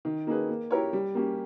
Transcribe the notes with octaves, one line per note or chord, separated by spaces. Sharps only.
D#3
A#3 D#4 G#4 B4
A#3
E4 G4 A#4 C#5
G3
A#3 C#4 G4